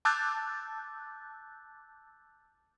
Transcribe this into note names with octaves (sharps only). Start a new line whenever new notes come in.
A5 D6 E6 F#6 G6 A6